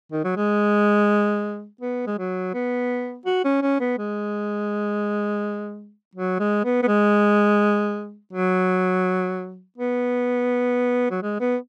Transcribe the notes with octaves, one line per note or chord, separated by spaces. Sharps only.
D#3
F#3
G#3
B3
G#3
F#3
B3
F#4
C#4
C#4
B3
G#3
F#3
G#3
B3
B3
G#3
F#3
B3
F#3
G#3
B3